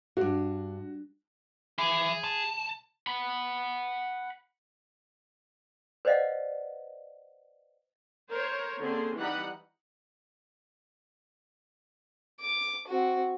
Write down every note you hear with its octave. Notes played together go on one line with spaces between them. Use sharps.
E2 G2 F#4
E3 G#4
C2 A5
F#5 B5
B4 C5 D5 D#5 F5 F#5
A#4 C5 C#5
D3 A#3 C4 C#4 G#4 C6
E3 G3 D#4 F#5 B5
D6
C4 F#4